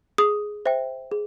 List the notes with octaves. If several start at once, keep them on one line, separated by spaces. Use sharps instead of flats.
G#4 D#6
C5 E5 G5
G#4